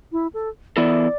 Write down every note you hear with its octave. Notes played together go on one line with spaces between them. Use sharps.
E4
A4
E2 E3 B3 E4 A4 D5